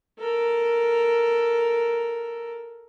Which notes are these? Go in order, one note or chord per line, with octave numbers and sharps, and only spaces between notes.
A4 A#4